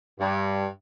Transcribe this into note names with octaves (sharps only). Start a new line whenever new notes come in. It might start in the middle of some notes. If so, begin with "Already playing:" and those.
G2